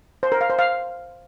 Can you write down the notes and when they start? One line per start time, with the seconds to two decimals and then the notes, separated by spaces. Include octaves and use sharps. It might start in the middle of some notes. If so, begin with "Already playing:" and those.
0.23 C5
0.32 A#4
0.41 F5
0.50 C5
0.59 F5